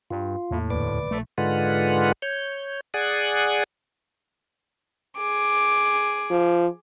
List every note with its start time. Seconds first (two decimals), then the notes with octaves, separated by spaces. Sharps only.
0.10 G2 F4
0.51 E2 A2 A#3
0.70 D#1 D2 B4 D5 D6
1.11 A#1 A3
1.38 G#2 D3 G#3 F4 B4 F#5
2.22 C#5 G6
2.94 G#4 D5 F#5 G#5 F#6
5.15 G#4 D6
6.31 F3